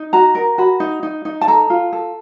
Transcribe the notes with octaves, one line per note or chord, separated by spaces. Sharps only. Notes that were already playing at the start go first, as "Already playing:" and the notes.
Already playing: D#4
F#4 A#5
A#4
F#4 B5
D#4
D#4
D#4
A5
A4 A#5
F4
A4